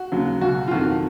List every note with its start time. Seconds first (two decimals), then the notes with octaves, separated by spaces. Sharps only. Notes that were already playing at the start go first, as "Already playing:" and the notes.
Already playing: F#4
0.12 D#2 C#3 F#3
0.41 C#2 B2 F#3 F#4
0.68 F4
0.71 F2 D#3 F#3 F#4